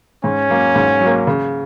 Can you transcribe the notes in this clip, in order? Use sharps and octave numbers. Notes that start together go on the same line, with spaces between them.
G#2 C#4
F#3 A#3
G#2
F#3
A#3
C#3